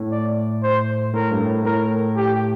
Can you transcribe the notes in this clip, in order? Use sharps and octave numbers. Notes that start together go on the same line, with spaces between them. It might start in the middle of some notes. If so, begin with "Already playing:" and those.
Already playing: A2
D5
C5
A2 A#4
G2
A2
A2 A#4
G4